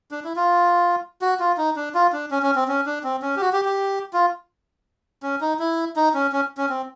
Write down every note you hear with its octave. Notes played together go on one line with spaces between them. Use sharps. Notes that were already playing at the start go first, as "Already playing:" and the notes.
D4
E4
F4
F#4
F4
D#4
D4
F4
D4
C#4
C#4
C4
C#4
D4
C4
C#4
G4
F#4
G4
G4
F4
C#4
D#4
E4
D#4
C#4
C#4
C#4
C4